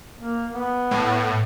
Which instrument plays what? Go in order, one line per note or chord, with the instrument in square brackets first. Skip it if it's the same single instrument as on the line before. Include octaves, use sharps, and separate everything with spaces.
[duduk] A#3
B3
[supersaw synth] A2